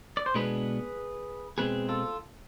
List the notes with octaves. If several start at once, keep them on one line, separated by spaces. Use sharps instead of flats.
D5
C5
B2 G#3 B3 D4 G#4 B4
B2 G#3 C4 G#4 B4
F4 A4